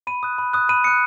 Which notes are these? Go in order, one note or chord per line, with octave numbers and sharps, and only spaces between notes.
B5 D#7
D#6 F#6
B5
D#6 F#6
B5 D#7
D#6 F#6 C#7